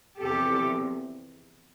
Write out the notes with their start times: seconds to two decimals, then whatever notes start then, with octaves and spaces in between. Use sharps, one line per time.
0.20 E2 C3 F3 G4 A4